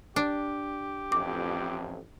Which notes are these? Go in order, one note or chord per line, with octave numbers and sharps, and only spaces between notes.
D4 G4
A1 F2 D6